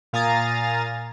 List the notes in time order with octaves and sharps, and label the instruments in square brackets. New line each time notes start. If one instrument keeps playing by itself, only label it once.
[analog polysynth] A#2 F5 G#5 A#5 D#6 A6